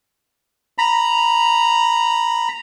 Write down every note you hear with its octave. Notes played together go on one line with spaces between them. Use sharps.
A#5 B5